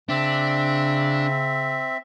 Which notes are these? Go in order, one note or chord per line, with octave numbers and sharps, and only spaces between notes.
C#3 C4 D4 E5